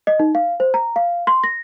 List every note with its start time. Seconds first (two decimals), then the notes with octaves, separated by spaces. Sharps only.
0.07 D#5
0.19 D#4
0.35 F5
0.60 C5
0.74 A#5
0.96 F5
1.27 C6
1.44 A#6